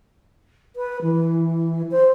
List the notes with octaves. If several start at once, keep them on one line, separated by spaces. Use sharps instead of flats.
B4
E3
C5